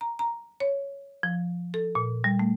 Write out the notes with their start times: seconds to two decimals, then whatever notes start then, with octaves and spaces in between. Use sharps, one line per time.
0.01 A#5
0.19 A#5
0.60 C#5
1.23 F3
1.74 A4
1.95 A#2
2.24 G3
2.39 A3